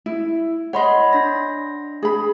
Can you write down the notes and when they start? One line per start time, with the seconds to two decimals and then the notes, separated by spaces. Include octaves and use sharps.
0.06 E4
0.73 C#5 D#5 F#5 B5 C6
1.13 D4 A#6
2.03 G#4 B5